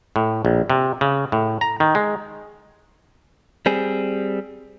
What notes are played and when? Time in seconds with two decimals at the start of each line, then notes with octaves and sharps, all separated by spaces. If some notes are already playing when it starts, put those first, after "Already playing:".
0.16 A2
0.45 A#1
0.70 C3
1.01 C#3
1.32 A2
1.61 A#5
1.80 D#3
1.95 G#3
3.66 G3 C4 G#4